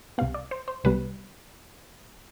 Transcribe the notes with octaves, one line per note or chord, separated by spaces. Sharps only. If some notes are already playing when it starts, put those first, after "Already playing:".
C2 C3 G3 B3 F5
D5
C5
C5
C2 C3 G3 B3 B4